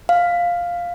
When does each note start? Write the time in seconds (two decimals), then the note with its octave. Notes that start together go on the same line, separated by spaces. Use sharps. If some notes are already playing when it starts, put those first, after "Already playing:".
0.09 F5